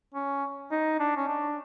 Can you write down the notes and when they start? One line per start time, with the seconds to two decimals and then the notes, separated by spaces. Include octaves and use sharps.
0.14 C#4
0.71 D#4
1.00 D4
1.17 C#4
1.28 D4